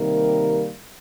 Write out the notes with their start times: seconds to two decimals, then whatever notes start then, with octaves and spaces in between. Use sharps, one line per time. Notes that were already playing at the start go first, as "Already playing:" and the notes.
Already playing: C3 D#3 G3 A#3 A#4